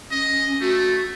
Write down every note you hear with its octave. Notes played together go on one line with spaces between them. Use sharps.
C#4 D#5
A3 F#4